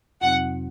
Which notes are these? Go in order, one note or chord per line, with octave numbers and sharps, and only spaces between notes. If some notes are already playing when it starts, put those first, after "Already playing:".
F2 C3 F#3 C4 D#4 F#5